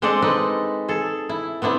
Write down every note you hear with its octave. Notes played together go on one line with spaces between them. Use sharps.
G#3 C4 D4 A4 D5 D#5
C4 D#4 B4
G#4 A4
E4
B3 C4 D4 E4